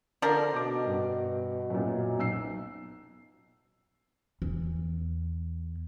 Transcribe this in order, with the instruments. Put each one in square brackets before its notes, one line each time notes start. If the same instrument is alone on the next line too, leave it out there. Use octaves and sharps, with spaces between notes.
[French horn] D3 [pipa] F3 D4 A#4
[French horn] B2 [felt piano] D#5 D6
[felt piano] G2
F#2 A#2
B1 E6 C7
[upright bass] E2